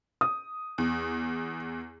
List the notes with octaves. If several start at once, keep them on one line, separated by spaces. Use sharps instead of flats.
D#6
E2